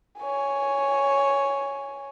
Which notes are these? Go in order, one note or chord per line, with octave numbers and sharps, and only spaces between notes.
C#5 G#5